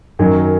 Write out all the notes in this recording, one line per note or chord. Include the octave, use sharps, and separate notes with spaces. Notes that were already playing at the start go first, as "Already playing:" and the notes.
F#2 D#3 F#3